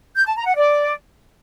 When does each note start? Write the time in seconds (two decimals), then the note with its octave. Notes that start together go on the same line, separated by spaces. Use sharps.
0.16 G6
0.26 A5
0.36 A#5
0.46 F#5
0.56 D5